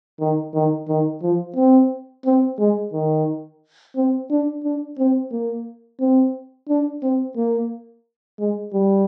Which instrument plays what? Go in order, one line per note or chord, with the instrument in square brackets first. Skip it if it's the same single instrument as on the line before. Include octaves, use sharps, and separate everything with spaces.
[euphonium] D#3
D#3
D#3
F3
C4
C4
G#3
D#3
C4
D4
D4
C4
A#3
C4
D4
C4
A#3
G#3
G3